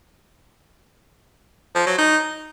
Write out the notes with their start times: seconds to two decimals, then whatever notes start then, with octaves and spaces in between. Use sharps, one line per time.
1.75 F3
1.87 F#3
1.98 D#4